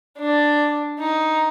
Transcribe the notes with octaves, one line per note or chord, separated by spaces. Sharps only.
D4 D5
D#4